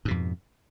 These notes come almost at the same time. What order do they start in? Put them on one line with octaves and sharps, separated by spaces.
G#2 B2 F2